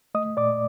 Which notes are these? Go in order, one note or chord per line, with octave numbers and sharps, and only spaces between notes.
A3 D#5 D#6
A#2 D5 D6